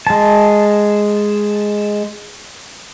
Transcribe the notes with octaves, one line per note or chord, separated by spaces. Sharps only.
G#3 A5